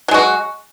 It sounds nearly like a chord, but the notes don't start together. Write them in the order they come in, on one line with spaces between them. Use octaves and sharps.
F#3 G#3 F#4